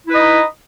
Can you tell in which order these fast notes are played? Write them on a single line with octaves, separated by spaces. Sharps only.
E4 B4 D#5 D#4